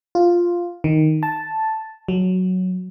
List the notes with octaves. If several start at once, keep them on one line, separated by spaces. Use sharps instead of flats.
F4
D#3
A5
F#3